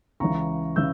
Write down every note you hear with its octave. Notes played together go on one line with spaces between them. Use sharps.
C#2 C#3 E3 A#5 C#6
C#3 E3 E6 G6